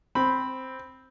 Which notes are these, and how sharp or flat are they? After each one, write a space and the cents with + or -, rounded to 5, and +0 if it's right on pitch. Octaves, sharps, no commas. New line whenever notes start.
C4 +0 B5 +0